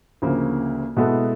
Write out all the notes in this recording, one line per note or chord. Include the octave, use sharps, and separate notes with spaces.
D2 C#3 F3 A#3
B2 G#3 B3 E4 A4